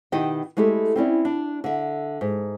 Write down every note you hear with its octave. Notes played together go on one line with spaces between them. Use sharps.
B2 D#3 E4 G4 D#5 G5
G#3 A3 E4 G4 A4
C4 C#4 E4 D5
D4
D3 E5
G#2